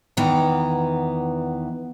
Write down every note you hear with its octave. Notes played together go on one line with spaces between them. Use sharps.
E2 D#3 E3 B3 A#5